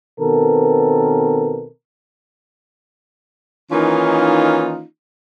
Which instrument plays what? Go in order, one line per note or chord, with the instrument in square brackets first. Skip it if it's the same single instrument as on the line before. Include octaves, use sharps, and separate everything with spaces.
[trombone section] B2 D#3 B3 C4 A4 A#4
[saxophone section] D#3 E3 A#3 C#4 D#4 F4